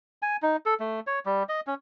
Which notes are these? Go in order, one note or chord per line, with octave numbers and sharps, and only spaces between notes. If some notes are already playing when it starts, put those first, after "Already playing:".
G#5
D#4
A4
A3
C#5
G3
D#5
C#4